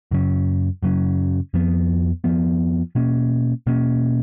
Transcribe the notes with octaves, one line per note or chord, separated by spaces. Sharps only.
F#2 C#3 F#3 C#4
F#2 C#3 F#3 C#4
F2 F3 B3
F2 F3 B3
B2 A#3 C#4
B2 A#3 C#4